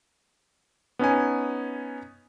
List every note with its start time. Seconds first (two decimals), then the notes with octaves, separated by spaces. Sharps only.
0.99 B3 C#4 D#4 G#5